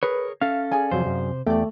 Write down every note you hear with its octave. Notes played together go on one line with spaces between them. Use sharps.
G#4 A#4 B4 C#5
C#4 A4 E5 F5
G#4 D5 G#5
F2 C3 F#3 C5
F#2
E2 A3 G4 D5